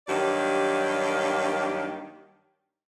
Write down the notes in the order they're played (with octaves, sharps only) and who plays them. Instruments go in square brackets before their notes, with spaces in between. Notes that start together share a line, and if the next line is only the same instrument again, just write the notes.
[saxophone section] G2 D#3 F#3 A#3 G4 D5